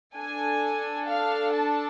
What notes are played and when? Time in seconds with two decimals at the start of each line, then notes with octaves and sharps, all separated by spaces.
0.16 D4 A4 G#5
1.08 F5
1.53 A5